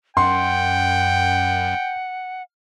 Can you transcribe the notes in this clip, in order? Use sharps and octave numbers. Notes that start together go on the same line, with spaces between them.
F#2 F#5 G5 C6